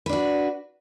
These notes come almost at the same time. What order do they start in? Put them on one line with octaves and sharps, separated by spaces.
B4 D4 F#4